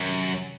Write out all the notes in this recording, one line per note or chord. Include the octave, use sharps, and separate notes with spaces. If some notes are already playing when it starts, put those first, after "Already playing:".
Already playing: F#2 C3 D#3